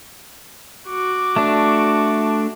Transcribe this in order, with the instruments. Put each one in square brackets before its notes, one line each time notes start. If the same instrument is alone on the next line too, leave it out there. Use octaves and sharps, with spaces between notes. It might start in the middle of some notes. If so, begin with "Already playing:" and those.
[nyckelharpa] F#4 D6
[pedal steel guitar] A3 D4